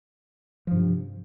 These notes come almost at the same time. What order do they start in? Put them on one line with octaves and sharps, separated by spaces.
F3 G2 C3